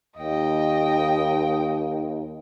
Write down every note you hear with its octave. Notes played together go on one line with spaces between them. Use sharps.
D#2 D#5 G5